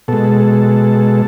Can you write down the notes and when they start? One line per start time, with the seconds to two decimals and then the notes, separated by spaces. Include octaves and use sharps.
0.08 B2 G#3 A4